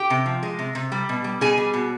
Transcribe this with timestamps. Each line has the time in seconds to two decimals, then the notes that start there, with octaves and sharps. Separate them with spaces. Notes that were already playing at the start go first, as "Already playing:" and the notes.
Already playing: G4 G5
0.10 C3
0.26 F3
0.43 G#3
0.59 C3
0.75 C3
0.92 G3
1.09 B2
1.24 G3
1.41 B2 G#4 G#5
1.58 G3
1.74 B2